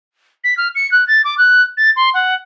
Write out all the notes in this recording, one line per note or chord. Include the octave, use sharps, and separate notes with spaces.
B6
F6
C#7
F#6
A6
D6
F#6
A6
C6
F#5